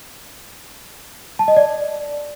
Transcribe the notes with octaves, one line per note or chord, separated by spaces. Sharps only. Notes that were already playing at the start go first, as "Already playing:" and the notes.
A5
D#5
D5